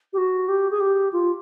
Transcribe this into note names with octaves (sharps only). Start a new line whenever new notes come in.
G4
F#4
G4
G#4
G4
F4